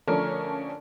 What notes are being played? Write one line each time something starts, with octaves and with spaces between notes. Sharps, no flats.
D3 F3 A3 C#4 D4 A#4